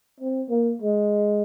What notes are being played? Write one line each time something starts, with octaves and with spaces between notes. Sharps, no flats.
C4
A#3
G#3